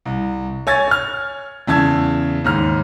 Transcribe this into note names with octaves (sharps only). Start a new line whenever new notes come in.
C2
C#5 G#5 G#6 A6
C#5 F6
E2 C#3 A5 E6 G#6
D#2 G#2 F6